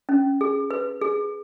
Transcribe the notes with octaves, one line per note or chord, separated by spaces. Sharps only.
C#4
G#4
B4
G#4